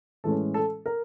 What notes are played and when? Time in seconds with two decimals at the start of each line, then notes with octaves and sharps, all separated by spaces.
0.24 A2 E3 G#3 C#4 A4
0.54 A4
0.86 A#4